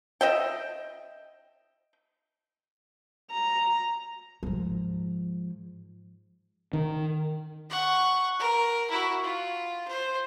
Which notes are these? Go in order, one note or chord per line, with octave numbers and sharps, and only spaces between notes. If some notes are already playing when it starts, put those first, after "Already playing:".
D#5 E5 G5
A#5
G#2 F3
D#3
F#5 C#6
A#4
E4 F#4
F4
C5